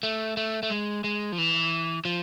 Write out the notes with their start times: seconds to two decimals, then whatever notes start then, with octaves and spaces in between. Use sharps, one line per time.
0.03 A3
0.37 A3
0.63 A3
0.70 G#3
1.04 G#3
1.32 F3
1.38 E3
2.05 F3